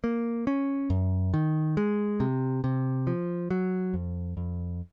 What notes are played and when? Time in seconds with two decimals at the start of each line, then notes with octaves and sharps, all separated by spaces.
0.04 A#3
0.47 C#4
0.90 F#2
1.34 D#3
1.77 G#3
2.20 C3
2.64 C3
3.07 F3
3.51 F#3
3.94 F2
4.37 F2